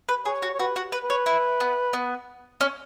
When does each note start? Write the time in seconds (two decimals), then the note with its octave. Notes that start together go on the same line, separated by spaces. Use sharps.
0.09 B4
0.25 G#4 C#5
0.42 F#4
0.54 C#5
0.59 F#4 B4
0.76 F#4
0.92 B4
1.04 B4
1.10 C#5
1.26 E4
1.60 B3
1.93 B3
2.61 C#4